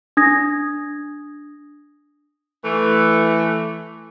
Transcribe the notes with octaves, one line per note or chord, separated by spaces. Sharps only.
D4 D#6 G#6 A#6
E3 A3